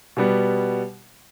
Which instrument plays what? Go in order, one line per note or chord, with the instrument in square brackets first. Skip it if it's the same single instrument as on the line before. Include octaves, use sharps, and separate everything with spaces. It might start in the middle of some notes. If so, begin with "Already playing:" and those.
[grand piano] B2 G3 B3